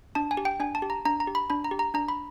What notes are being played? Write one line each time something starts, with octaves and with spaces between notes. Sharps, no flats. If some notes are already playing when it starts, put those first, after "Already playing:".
D4 A5
G#5
G4
G5
D4 G#5
A5
G4
A#5
D4 A#5
A#5
G4
B5
D4 B5
A#5
G4
A#5
D4 A#5
B5